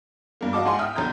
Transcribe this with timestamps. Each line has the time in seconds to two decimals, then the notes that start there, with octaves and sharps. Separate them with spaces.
0.41 G2 A#3
0.53 F#4 D#5 F5 A5 D6
0.65 G#2 F#5 G#5 C6
0.79 E5 G5 D#6 F6
0.96 B1 D3 A#5 G6